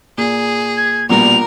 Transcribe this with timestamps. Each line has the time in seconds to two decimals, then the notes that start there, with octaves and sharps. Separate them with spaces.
0.18 A#2 G#4
0.77 G#6
1.09 A#1 B2 G3 A#4 F7